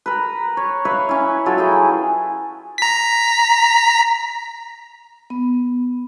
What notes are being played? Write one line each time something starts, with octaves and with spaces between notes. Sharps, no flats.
A#4 B4
C#5
B4 C#5 E5 F5
C#4 E4
F#3 F4 A4
E4 G#4 G5
A#5 B6
B3